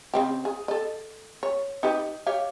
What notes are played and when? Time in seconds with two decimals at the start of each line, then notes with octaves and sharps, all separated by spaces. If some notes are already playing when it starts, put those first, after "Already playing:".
0.14 C#3 C4 G4
0.45 G#4
0.68 A4 D#5
1.43 C#5
1.83 D#4 G4 B4
2.26 G4 C#5 F5